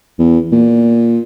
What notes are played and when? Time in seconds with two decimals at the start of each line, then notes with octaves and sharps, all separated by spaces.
0.19 E2
0.52 A#2